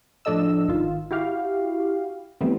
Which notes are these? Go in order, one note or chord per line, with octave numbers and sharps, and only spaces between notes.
A2 F3 D4 A4 D#5 E6
G#1 D#3 F4
E4 F#4 G4 F5
E3 F#3 G3 A3 B3 C4